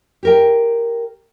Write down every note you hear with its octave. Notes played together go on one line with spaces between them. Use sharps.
G4 A#4 G5